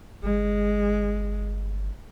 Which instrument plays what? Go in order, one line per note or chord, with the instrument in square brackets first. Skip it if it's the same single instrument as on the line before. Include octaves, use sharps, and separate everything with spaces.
[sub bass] G1 [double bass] G#3